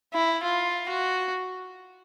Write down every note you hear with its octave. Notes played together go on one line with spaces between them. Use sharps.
E4
F4
F#4